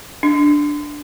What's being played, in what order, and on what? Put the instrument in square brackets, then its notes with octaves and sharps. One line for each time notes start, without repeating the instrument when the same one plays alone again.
[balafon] D4